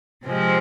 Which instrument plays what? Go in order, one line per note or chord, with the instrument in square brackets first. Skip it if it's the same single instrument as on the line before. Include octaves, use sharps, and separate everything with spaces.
[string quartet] C3 F3 G#3 C4